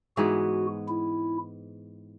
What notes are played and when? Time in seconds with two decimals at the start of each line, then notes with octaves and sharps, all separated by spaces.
0.17 G#2 E3 G#3 B3 F#4
0.88 E4